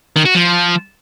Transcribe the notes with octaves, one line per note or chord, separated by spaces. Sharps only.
D#3
F#4
F3